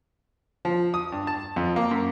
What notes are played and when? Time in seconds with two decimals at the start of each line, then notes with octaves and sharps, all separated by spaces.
0.65 F3
0.94 D#6
1.12 G2
1.27 A5
1.56 F2
1.76 A#3
1.91 F#2